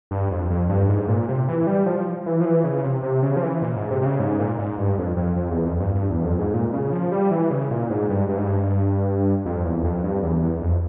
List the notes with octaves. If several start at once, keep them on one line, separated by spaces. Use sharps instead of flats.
G2
F2
F2
G2
G#2
A#2
C3
E3
G3
F3
E3
F3
E3
C#3
C3
C3
C#3
F3
E3
A#2
G#2
C3
C3
C#3
G#2
A#2
G#2
G2
F2
F2
F2
E2
F2
G2
G2
E2
F2
G#2
A#2
C#3
F3
G3
E3
C#3
A#2
G#2
G2
G2
G#2
G2
F2
E2
F2
G2
E2
E2
F2